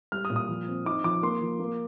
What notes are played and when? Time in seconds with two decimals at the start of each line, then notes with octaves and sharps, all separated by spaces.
0.12 G3 F6
0.25 D#6
0.30 A#2
0.36 D#6
0.48 F3
0.68 C4
0.85 D#4 D6
1.04 F3 D6
1.23 A#3 C6
1.41 F3
1.59 A#3